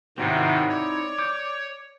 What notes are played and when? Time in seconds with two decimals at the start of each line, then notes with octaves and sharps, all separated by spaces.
0.18 G#2 C3 D#3 C4 D#4 E4 F#4 C#5
0.69 C#5 D5
1.19 D6 G6